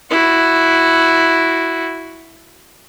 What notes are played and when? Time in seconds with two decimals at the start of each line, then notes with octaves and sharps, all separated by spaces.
0.10 E4 F#4